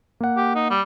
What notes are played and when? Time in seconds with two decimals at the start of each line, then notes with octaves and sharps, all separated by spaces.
0.21 A#3 F#5
0.37 G4
0.55 D#4
0.70 G3